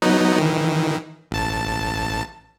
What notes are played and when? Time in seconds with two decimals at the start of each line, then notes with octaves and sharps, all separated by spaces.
0.02 F#3 B3 D#4
0.38 D#3 E3
1.31 A1 A5